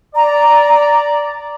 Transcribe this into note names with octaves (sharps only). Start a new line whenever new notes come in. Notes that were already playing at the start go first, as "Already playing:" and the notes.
D5 A#5